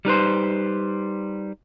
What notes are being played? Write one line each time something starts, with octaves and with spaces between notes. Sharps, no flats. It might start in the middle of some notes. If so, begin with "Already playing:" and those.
G3 D#4 B4 C5